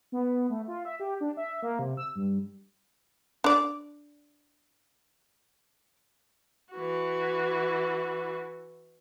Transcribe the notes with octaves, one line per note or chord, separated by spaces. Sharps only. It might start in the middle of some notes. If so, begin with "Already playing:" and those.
B3
A3
F4
E5
G4
D4
E5
A#3
C3
E6
G2
D4 D5
E3 F#4